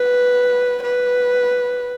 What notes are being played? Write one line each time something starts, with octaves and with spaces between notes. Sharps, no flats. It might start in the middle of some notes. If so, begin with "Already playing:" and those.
Already playing: B4
B4